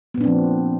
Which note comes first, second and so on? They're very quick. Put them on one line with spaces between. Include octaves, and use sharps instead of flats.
B3 A#2 D4 C4 F3